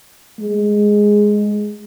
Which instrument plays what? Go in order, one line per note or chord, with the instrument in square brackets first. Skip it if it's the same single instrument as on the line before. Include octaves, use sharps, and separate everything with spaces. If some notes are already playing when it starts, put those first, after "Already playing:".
[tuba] G#3